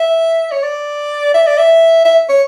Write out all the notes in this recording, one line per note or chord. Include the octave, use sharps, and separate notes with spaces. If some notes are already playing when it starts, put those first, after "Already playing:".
Already playing: E5
C#5
D5
E5
D5
E5
E5
C#5